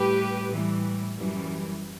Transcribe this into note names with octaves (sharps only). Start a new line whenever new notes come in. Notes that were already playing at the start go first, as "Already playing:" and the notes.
Already playing: A2 G3 G4 B4
A2 E3 G3
F#2 E3 G3